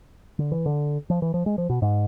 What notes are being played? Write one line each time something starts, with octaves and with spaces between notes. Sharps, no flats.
D3
E3
D3
F3
E3
F3
G#3
F3
B2
G#2